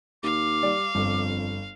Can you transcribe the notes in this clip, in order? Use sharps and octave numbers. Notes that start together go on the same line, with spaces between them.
D#2 F5 D6
G3 D5
G1 F2